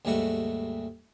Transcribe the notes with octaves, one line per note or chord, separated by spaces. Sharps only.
D#2 G#2 G3 A3 F#4 C#6